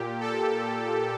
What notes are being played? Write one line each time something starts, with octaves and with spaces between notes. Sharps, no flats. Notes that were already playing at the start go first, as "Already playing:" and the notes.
Already playing: A#2 G4
A4